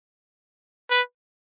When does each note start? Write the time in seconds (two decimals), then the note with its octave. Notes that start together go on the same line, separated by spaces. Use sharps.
0.90 B4